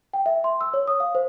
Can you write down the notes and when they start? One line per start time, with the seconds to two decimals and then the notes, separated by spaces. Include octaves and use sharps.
0.13 G5
0.26 E5
0.44 C6
0.61 E6
0.74 C#5
0.87 D#6
1.00 F5
1.15 C5